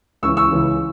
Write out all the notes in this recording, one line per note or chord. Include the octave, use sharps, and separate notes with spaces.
C#2 C#3 E3 C#6 E6
C#6 E6
C#2 C#3 E3